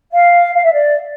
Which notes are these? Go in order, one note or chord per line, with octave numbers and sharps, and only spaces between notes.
F5
F5
E5
D5